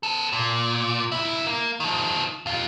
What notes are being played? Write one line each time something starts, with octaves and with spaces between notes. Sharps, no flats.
B3 A4
A#2
C#2 E4
A#3
D#3 F3
D#2 F4